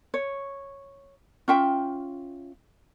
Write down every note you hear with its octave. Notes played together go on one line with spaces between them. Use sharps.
C#5
C#4 F4 E5 G5